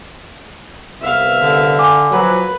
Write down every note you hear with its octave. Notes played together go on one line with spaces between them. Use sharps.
C2 B3 E5 F5
D3
G#5 D6
F3 F#3 B4